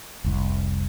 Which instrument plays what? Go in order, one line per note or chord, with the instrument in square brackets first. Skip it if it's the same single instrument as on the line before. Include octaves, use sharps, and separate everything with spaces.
[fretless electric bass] F1 C2